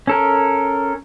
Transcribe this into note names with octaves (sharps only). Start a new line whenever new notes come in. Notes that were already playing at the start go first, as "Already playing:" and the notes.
C#4 A4 A#4